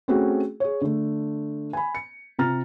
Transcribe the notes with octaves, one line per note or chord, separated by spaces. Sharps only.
A3 C4 C#4 F#4 G#4
G#4 C#5
D3 A3
G#5 B5
C#7
C3 F4 A#5 F6 A6